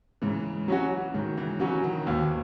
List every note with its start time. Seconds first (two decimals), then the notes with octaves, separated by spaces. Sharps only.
0.22 G#2 C#3 E3
0.68 F#3 C#4 F#4
1.14 G#2 D#3 F#3
1.37 C#3 E3
1.60 C#3 E3 F#3 C#4 F#4
1.83 B2 D#3
2.07 D#2 G#2 B2